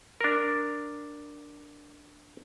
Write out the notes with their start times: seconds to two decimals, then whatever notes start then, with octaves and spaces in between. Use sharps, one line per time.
0.21 D4 A#4